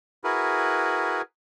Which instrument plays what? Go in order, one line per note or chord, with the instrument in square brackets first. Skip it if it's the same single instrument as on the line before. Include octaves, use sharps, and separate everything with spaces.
[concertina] E4 F#4 G#4 A#4 B4